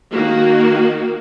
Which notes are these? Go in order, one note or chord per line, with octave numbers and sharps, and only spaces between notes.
D#3 A#3 F#4